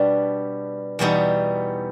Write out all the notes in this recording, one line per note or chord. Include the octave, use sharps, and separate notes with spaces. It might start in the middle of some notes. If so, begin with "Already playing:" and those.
Already playing: B2 G3 B3 D4
E2 B2 G3 B3 D#4